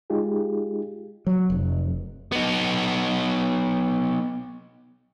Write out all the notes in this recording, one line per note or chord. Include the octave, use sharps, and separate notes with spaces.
G#3 D#4 F4 G4 G#4
F#3
F1
B3 D#4